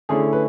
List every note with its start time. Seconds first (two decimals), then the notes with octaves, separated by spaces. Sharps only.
0.09 D3 A3 C#4 E4 G#4
0.33 B4